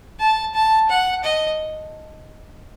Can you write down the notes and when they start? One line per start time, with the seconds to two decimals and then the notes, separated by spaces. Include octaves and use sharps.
0.20 A5
0.54 A5
0.89 F#5
1.24 D#5